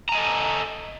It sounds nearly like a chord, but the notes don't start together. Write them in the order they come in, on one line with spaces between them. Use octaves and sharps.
A#5 G#5 D#5 A4